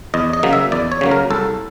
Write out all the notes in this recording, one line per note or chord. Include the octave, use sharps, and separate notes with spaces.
E2 D#5
D#5
C#3 F#3 A#3
E5
E2 D5
C#5
C#3 F#3 A#3
A#4
C2 A4